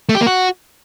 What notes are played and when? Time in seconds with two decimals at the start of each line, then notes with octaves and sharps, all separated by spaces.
0.09 A3
0.15 G4
0.21 A#3
0.27 F#4